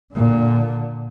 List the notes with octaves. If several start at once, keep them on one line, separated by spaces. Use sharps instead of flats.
A#2 D3